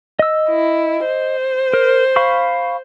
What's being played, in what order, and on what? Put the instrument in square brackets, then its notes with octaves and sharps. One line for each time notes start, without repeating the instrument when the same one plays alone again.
[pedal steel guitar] D#5 E6
[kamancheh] E4
C5
[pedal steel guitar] A#4
F5 B5 C#6